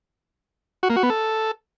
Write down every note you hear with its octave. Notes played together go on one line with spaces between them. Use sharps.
F#4
A#3
F#4
B3
A4